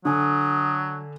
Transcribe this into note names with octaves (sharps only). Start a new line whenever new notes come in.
D3 F#3 G#5 D#6